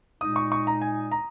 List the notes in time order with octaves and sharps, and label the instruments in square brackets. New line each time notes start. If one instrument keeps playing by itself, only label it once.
[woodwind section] A#2 G#3 D#4 [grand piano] D#6
[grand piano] C#6
C#6
A#5
G#5
A#5